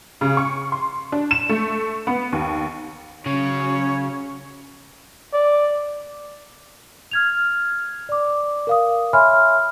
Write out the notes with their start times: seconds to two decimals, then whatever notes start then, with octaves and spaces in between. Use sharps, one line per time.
0.21 C#3
0.37 C#6
0.72 C6
1.12 D4
1.31 E7
1.49 A3
2.07 B3
2.33 D#2
3.26 C#3 F#3 C#4 C#5
5.34 D5
7.11 F6 G#6 F7
8.09 D5 D6
8.67 A#4 F5 D#6
9.13 C#5 E5 G#5 B5 C6 F6